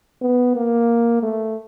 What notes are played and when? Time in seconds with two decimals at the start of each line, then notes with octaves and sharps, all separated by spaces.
0.22 B3
0.56 A#3
1.23 A3